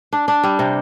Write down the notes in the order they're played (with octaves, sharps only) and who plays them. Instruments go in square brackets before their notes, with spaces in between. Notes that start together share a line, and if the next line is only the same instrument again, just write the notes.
[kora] D4
D4
G3
C3